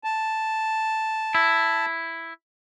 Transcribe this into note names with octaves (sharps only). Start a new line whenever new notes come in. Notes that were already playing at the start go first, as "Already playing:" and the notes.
A5
E4